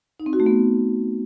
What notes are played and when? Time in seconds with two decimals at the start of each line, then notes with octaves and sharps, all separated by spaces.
0.20 D#4
0.26 C4
0.33 F#4
0.40 A3
0.46 B3